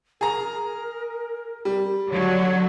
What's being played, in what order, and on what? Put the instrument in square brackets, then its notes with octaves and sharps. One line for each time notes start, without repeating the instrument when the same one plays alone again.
[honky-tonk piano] G#4 A#5 [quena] A#4
[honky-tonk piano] G3
[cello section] D3 F#3 [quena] C#5